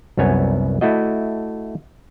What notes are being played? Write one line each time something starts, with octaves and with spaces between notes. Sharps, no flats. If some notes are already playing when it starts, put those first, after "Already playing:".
C2 F#2 B3 C#5 G#5
A3 E4 F#4 D#5